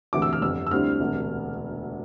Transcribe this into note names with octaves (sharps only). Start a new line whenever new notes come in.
E1 D2 C3 E3 D6
E6
F6
G1 F2 C3 E6
E6
D2 D3 G3 C4 E4 F6
E1 D2 C3